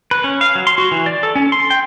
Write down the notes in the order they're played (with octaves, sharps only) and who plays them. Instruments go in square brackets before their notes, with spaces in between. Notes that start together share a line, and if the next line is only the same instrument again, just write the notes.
[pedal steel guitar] B4
C#4
F5
F#3
C6
F#4
E3
D5
A4
C#4
C6
G5